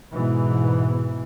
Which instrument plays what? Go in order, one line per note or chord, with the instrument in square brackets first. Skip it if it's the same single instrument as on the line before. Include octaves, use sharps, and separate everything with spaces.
[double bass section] G#2 B2 E3